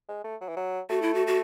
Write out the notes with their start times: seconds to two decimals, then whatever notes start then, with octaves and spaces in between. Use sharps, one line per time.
0.09 G#3
0.24 A3
0.41 F#3
0.48 E3
0.56 F#3
0.89 A3 F#4
1.02 E4
1.15 F#4
1.27 F#4